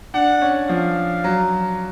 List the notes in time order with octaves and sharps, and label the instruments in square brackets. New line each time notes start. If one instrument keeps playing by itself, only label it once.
[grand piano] D4 [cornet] F#5
[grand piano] C#4
[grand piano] F3 [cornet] F5
[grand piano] F#3